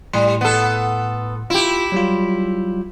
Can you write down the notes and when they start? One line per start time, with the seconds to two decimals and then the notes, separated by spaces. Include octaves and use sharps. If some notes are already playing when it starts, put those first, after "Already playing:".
0.13 A2 G3 C6
0.41 B3 A4
1.50 E4 F4 G4
1.92 F#3 G3 F4